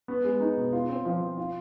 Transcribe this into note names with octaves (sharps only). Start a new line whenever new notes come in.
B3
G#3
D#4
B2
F4
C4
F3
F3
F4